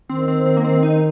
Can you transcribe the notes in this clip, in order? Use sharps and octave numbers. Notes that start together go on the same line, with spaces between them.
D#3 C4
C4
C4
A#3
C4
D#4